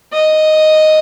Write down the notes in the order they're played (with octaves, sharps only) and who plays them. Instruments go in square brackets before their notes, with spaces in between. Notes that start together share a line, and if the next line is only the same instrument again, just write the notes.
[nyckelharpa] D#5